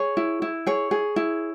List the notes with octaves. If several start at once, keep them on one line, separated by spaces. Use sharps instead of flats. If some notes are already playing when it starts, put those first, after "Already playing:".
Already playing: G#4 C#5
E4
E4
G#4 C#5
G#4
E4